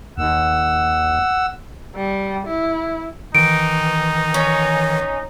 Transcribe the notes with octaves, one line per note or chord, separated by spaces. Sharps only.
D#2 F#5 E6
G3
E4
D#3 E3 D#4 D7
C#4